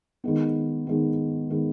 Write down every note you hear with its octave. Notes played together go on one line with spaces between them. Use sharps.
D#3 G#3 B3
D#3 G#3 B3
D#3 G#3 B3